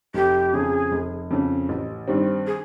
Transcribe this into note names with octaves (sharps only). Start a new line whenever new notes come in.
F1 G4
F2 C#3 G#4
F1
F2 C#3
A1
G2 D#3 G3 C4
G#4